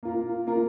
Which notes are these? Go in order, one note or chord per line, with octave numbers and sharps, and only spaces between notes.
A#3 F4 A#4
A#3 F4 A#4